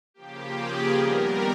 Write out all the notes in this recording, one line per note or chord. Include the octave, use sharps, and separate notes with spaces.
C#3 F3 A#3 G4
G#4
D#3 G3 B3 A#4